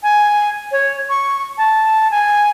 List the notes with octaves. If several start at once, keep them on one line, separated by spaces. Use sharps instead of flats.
G#5
C#5
C#6
A5
G#5